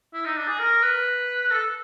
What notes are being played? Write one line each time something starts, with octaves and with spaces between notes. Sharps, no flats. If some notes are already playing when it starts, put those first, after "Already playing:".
E4
D#4
D4
G#4
A#4
B4
A4